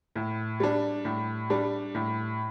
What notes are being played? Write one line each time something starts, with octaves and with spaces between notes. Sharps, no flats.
A2
G3 D4
A2
G3 D4
A2